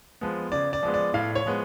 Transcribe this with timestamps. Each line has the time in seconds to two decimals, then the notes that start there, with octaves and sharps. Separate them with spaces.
0.21 F3 G#3 B3
0.52 C#3 D5
0.73 D5
0.83 F3 G#3 B3
0.94 D5
1.14 A2 F5
1.35 C#5
1.46 F3 G#3 B3